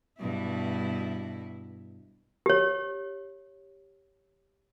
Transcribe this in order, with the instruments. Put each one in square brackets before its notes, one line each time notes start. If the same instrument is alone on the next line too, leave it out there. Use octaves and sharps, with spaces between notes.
[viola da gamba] G2 B2 E4
[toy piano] G4 C#5